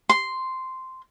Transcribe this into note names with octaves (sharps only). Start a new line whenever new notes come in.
C6